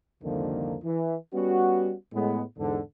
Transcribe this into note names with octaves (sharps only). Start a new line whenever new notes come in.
C2 F2 D3 D#3 F3 A#3
E3
G3 B3 C#4 F#4
A2 G#3 B3
E2 G#2 D3